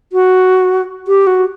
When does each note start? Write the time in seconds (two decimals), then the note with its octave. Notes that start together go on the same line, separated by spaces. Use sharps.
0.13 F#4
1.08 G4
1.27 F#4